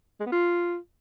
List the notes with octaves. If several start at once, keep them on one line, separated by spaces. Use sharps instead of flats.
G#3
B3
F4